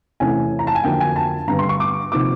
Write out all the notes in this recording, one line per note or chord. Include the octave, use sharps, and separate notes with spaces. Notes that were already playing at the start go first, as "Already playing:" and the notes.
E2 C3 E3 A3 C#4 G#5
A#5
A5
G#5
F2 D3 F#3 A#3 D4 G5
G#5
A5
G2 D3 G3 B3 A#5
C6
C#6
D6
C3 F3 A#3 D#4 D6